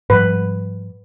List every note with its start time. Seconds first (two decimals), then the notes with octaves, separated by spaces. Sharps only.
0.10 G#2 F3 G3 B4